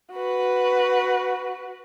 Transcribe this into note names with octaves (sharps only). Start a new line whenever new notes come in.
F#4 B4